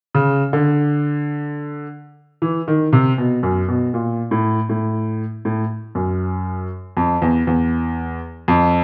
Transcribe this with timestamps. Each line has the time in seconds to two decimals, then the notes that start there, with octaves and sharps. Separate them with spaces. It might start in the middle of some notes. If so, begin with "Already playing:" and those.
0.15 C#3
0.53 D3
2.42 E3
2.68 D#3
2.93 C3
3.18 B2
3.43 F#2
3.68 B2
3.94 A#2
4.31 A2
4.69 A2
5.45 A2
5.95 F#2
6.97 F2
7.22 E2
7.47 E2
8.48 F2